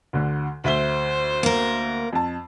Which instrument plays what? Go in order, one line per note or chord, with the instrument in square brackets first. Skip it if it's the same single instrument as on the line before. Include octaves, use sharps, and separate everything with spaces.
[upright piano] D2 D3
[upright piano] D2 E5 G7 [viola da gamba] C5
[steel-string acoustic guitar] A#3 A#4
[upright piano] F2 A5